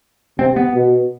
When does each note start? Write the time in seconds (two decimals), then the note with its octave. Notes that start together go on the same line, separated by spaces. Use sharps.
0.39 C3 C4
0.56 B3
0.74 B2